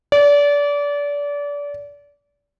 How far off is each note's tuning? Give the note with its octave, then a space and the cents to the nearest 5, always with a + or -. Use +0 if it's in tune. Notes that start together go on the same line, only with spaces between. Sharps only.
D5 -30